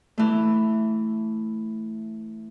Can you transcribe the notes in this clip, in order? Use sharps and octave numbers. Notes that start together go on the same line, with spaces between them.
E3 A3